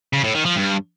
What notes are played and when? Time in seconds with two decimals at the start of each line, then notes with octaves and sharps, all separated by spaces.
0.13 C#3
0.24 A2
0.34 D#3
0.45 F3
0.56 G2